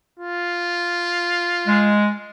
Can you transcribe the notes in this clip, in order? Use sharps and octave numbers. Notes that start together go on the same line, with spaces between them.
F4
G#3